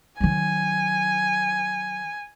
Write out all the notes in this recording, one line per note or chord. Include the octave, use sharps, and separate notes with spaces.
D#3 F#3 G#5